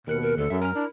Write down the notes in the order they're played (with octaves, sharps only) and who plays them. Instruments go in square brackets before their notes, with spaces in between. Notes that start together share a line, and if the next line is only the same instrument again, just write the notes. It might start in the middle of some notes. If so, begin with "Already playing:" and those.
[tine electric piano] D#2 F#6 C#7 [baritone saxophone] B2 [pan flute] A#4
[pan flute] A#4
[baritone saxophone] D2 [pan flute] A4
[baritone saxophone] F#2 [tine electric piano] E5
[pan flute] C#4 [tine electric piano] A#4 F6
[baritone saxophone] D4 [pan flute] E4